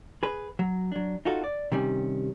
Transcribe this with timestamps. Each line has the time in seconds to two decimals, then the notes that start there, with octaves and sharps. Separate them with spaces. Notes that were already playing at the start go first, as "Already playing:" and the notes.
0.23 G#4 B4
0.59 F#3
0.92 F#3 D4
1.25 D#4 F4 F#4 A4
1.44 D5
1.72 C3 D#3 G3 C#4